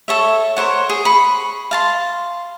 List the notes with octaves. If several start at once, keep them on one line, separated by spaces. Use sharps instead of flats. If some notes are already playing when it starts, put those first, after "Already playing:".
A4 C#5 E5
A#4 C5 C#5 F#5
G#4
B5 C#6
F5 A5 C6